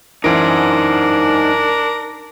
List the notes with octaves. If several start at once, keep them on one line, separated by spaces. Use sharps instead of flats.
F#2 E3 D4 D#4 A#4 C5 D7